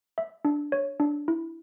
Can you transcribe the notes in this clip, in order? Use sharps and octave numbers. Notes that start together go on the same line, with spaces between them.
E5
D4
C#5
D4
E4